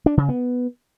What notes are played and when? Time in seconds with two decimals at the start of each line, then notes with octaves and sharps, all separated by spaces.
0.06 D4
0.17 C#3
0.29 B3